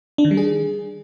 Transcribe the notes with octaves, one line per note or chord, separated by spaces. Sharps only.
D4
D#3
G3
G#4